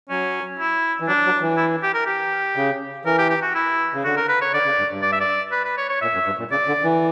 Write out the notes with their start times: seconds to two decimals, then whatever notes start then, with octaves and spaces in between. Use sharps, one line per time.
0.10 F#3 C#4
0.59 E4
1.00 E3
1.08 F#3 D4
1.25 F#3
1.41 E3
1.57 E4
1.83 G4
1.94 A#4
2.06 G4
2.56 C#3
3.05 E3 A#4
3.18 G4
3.30 G4
3.42 F#4
3.55 E4
3.94 C#3
4.04 D3 F#4
4.17 A#4
4.29 B4
4.41 C#5
4.53 D3 D5
4.65 C#3
4.78 G2
4.90 G2
5.02 D5
5.12 E5
5.20 D5
5.52 B4
5.64 B4
5.77 C#5
5.89 C#5
6.01 A#2 E5
6.14 F#2
6.26 G2
6.39 A#2
6.51 C#3 D5
6.68 D3
6.84 E3